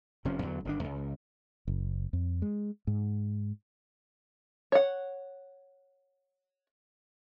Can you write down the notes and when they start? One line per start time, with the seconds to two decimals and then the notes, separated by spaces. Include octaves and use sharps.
0.25 F1 C3 F3 C#4
0.42 E2 D3 F#3
0.65 G1 D#3 D4
0.84 C#2
1.67 F#1
2.13 F2
2.42 G#3
2.87 G#2
4.72 C#5 F#5